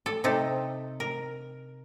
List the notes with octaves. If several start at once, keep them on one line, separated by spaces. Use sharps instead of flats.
A4
C3 D#4 A4
A#4